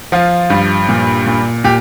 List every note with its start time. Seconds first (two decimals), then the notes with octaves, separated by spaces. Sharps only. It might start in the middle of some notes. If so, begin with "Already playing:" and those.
0.12 F3 F4
0.50 G2
0.89 A#2
1.26 A#2
1.64 A#2 G4